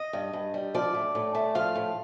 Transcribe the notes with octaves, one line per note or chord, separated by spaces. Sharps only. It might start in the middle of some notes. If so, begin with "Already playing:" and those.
Already playing: D#5
G2
G2
G3
F3 D5
A2
A2
A3
F3 F5
A2